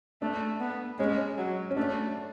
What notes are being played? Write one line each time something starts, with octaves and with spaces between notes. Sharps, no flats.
A3 D4
B3
G#3 C#4
F#3
C#4
A3 D4